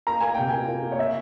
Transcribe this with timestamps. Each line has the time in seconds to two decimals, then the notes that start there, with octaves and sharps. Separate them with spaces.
0.07 A#3 A#5
0.21 A#3 G#5
0.34 C3 G5
0.49 A#3 G#5
0.68 A#3
0.83 A#3
0.92 C#5
0.99 E5